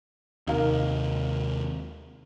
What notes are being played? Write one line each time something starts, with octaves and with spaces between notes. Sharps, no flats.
D#2 C3 D#4 A#4 F5